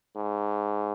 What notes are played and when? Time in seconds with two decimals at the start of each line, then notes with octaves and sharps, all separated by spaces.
0.16 G#2